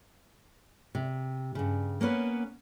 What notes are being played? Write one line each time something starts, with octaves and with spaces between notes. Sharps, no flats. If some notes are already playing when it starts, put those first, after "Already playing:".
C3
G2 C#3
A#3 B3 C#4 B4